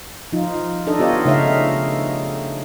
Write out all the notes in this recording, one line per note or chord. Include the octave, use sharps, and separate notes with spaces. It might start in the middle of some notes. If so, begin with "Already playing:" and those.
F3 D#4 F4
D4 D#4 A4 D#5
B3 F4 G4 C#5 D#5
C#3 A3 D#4 C#5 E5 F5